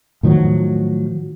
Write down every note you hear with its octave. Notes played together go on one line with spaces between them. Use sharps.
A2 D#3 F3 F#3